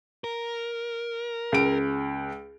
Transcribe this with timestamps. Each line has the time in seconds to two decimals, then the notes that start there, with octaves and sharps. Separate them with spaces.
0.24 A#4
1.52 C#2 D7